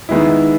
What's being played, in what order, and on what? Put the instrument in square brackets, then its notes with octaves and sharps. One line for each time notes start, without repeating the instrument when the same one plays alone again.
[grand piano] D#3 G#3 B3 E4